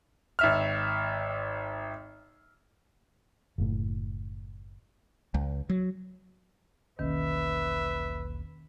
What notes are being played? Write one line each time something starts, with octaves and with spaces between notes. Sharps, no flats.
G#1 E5 F6
F#1 A2
C#2
F#3
E1 B1 D#3 A#3 C#4 B4 E5